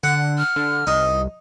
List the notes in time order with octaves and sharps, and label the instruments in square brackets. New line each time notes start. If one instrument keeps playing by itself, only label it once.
[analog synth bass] D3 [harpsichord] F#5
[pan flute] F6
[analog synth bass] D3
[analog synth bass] C2 [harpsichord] D#4